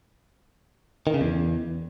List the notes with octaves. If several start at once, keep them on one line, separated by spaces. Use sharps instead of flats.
D#3
C#3
E2